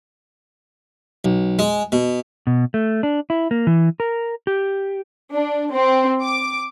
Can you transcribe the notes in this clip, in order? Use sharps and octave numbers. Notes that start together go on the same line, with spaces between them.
B1
G#3
B2
B2
A3
D4
E4
A#3
E3
A#4
G4
D4
C4
D6